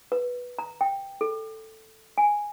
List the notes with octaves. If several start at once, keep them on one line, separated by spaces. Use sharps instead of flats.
B4
A#5
G5
A4
G#5